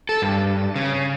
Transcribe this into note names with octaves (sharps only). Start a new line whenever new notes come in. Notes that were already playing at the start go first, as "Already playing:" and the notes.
A4
G2
C#3